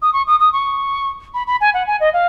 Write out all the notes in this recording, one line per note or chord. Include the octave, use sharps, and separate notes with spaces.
D#6
C#6
D#6
D#6
C#6
B5
B5
G#5
F#5
G#5
D#5
F5